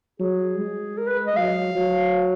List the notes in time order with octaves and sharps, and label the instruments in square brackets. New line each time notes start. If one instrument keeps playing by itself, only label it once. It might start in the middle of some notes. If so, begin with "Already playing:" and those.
[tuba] F#3 [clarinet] G#4
[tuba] G#3
[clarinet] A#4
B4
D#5
[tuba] F#3 [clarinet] F5
[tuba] F#3